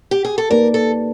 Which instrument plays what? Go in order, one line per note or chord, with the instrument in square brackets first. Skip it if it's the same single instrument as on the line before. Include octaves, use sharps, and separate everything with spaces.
[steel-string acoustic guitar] G4
G#4
A4
[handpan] A#3 D#4 G4 B4 D5 [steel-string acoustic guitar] A#4
[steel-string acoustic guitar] A4